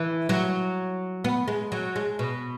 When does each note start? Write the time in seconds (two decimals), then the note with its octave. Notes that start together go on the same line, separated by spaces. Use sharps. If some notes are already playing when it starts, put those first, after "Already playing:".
Already playing: E3
0.29 F#3
1.24 B3
1.48 G#3
1.72 F#3
1.96 G#3
2.19 B2